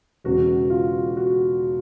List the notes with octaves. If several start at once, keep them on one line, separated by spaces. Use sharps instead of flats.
E1 E2 C#3 F#4
F4
F#4